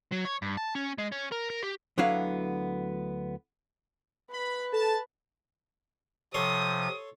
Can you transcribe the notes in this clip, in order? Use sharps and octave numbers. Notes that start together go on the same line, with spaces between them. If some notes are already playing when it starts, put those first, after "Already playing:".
F#3
C#5
G2
A5
C#4
G#3
C#4
A#4
A#4
G4
D2 D3 F#3 B3 E4 F5
B4 B5
A4 A5
C3 F3 A4 C#5 C6 D#6